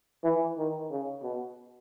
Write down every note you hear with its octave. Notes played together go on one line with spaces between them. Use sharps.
E3
D#3
C#3
B2